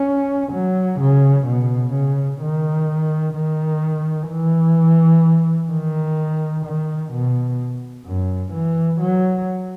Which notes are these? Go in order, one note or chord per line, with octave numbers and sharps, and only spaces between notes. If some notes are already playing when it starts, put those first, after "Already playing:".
Already playing: C#4
F#3
C#3
B2
C#3
D#3
D#3
E3
D#3
D#3
B2
F#2
E3
F#3